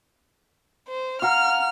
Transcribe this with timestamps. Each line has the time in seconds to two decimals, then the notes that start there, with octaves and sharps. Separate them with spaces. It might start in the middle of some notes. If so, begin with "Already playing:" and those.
0.88 C5
1.22 F5 F#5 A#5 F6